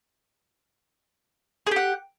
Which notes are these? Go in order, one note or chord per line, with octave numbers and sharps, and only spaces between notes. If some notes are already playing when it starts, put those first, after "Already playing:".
G4 G#4 F#5